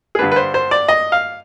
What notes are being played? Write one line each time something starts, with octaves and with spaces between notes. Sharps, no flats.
G#4
G2 D3 G3 D4 B4
B4
C5
C5
D5
D#5
F5